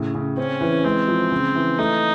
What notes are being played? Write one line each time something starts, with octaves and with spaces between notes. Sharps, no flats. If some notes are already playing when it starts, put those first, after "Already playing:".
Already playing: A2 C#3
C#3
C4 C#4
E3
G#3 C4
F3
C#3
E3
A3 D#4